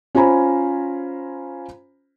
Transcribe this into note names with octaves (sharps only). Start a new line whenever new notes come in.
C#4 F4 C5 G#5 A#5 B5